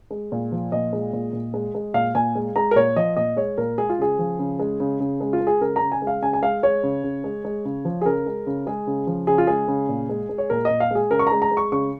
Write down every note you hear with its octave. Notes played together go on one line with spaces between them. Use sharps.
G#3
A#2
F3
A#2 D#5
G#3
A#2
A#2
G#3
G#3
A#2 F5
A#2 G#5
G#3
G#3 A#5
A#4
A#2 C#5
F3 D#5
A#2 D#5
G#3 C#5
A#2 A#4
G#3 G#4
F4
C#3 G#4
F3
C#3
G#3
C#3
C#3
G#3
F4
G#3
G#4
C#3 A#4
A#5
C#3
G#5
G#3
F5
C#3 G#5
G#5
G#3 F5
G#3 C#5
C#3
C#3
G#3
G#3
C#3
F3
G#4
C#3 A#4
G#3
C#3
G#3 G#4
C#3
F3
C#3 G#4
F4
G#3 G#4
C#3
A#2
G#3
G#3
C#5
A#2 A#4
D#5
A#2
F5
G#3 G#4
C#3 A#4
C#6
G#3 A#5
A#5
G#3
C#6
C#3 C#6